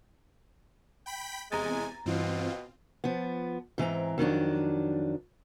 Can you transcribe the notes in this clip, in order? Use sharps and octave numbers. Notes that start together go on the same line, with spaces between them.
G5 B5 B6
E2 C3 G#3 G#5 A#5 A6
G2 B2 E3 C4 F4
F3 B3
G#2 E3 C4 A#5
F2 D#3 F#3 D4